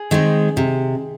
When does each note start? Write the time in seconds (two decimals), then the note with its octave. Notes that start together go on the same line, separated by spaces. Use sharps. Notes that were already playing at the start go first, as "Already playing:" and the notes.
Already playing: G#4
0.11 D#3 G#3 C4
0.57 C3